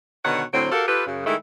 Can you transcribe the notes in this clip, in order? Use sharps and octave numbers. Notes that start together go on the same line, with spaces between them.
B2 D3 D#3 C#5 F#5
A2 D3 F#3 C4
F#4 G4 A4 A#4 F5
F4 G4 A4 B4
F#2 C#3
D#3 G#3 A3 E4